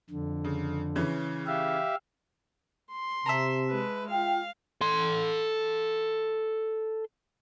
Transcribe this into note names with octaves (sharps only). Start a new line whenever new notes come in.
F2 D3
C#3
C#3 E3 C#4
G4 E5 F5
C6
C3 E5 A5 A#5
G#3 B4
F4 F5 G5
A4 C6